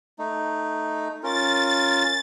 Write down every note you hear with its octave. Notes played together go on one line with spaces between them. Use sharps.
A3 D#4
C#4 F4 A#4 A6